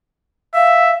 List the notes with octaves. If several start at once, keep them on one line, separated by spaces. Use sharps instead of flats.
E5 F5